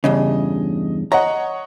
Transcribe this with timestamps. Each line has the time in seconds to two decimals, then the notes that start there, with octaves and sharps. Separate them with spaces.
0.04 E2 G2 C#3 D#5
1.12 C#5 D#5 F#5 A#5